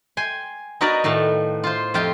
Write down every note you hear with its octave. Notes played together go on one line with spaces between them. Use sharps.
G5 G#5 C6
B3 D#4 F#4 A#4 B4 D5
A2 D#3 F5 A5
F4 C5
F2 F4 G4 G5